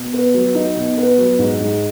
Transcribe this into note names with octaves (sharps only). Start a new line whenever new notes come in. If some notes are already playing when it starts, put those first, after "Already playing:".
Already playing: B2
B3
F#3
D#4
B2
B3
F#3
G#2
G#2